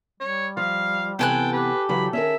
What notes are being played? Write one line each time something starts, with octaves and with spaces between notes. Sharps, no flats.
G3 C#5
F3 F5
C3 E3 B3 A4 G5 G#5 F#6
G4 B4
C#3 E3 F#3 B5
D#3 C#4 G#4 A#4 E5